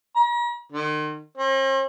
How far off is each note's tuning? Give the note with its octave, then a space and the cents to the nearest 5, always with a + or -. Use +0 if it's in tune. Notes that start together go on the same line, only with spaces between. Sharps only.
A#5 +45
D#3 -40
C4 +45